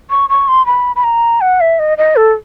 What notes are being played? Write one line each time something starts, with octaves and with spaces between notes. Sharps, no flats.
C#6
C#6
C6
B5
B5
A#5
F#5
E5
D#5
D#5
A4